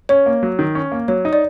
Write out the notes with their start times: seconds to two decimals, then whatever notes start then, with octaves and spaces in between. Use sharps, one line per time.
0.09 C#4 C#5
0.26 A#3
0.43 F#3
0.59 D#3
0.75 C#4
0.92 A#3
1.08 F#3 C#5
1.25 D#4
1.33 D5